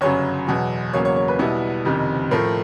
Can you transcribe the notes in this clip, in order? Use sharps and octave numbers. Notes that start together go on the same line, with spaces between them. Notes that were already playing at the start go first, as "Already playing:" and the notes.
G1 F#2 C#3 F#3 C#5
E2 B2 F#3
E2 C#3 F#3 A#3 C#4 C#5
C#5
C#5
B4
B1 B2 G3 B3 E4
F#1 F2 C3 D#3
A2 F3 A3 A#4